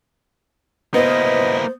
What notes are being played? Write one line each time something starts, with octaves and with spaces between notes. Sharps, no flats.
A#3 B3 E4 C5 D#5